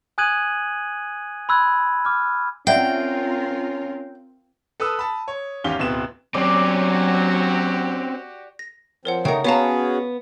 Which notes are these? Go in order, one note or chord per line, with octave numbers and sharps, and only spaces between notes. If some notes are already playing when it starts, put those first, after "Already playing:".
G#5 D#6 F#6 G#6 D#7 F#7
B5 C6 E6 F#6 G#6
D6 F6
C4 C#4 F4 A#4 D5 E5 F#5 G5
A4 B4 A5 D#6 E6
A5 B5
C#5
G#1 E2 C#4 G4 F5 G7
D1 B2 C4 B4 E7
F#3 C4 C#4 F#4 G4 D5
A#6
F3 C4 A#4 C#5 F#5
C#3 A3 D#4 A#4 F#5 G5
B3 C#4 F#4 G#4 C#5 F5 A5 A#5